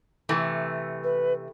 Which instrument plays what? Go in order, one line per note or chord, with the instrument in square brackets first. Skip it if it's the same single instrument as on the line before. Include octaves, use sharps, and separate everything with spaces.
[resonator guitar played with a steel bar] C3 E3 A3
[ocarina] B4